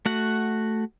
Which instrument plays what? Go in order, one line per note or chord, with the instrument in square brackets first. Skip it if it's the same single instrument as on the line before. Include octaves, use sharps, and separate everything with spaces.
[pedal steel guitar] A3 F#4 F#5